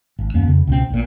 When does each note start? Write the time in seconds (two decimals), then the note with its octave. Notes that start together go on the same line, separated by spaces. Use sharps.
0.19 G#1
0.34 D#1 F#2 A#3 B3
0.48 F2 C#3
0.67 C#2 B2 C4
0.90 A#1 A#2